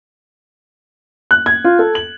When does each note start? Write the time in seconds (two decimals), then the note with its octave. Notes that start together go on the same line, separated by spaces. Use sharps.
1.31 F#6
1.46 G#6
1.64 F4
1.79 A4
1.95 F#7